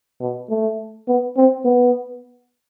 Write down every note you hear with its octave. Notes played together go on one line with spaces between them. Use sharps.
B2
A3
B3
C4
B3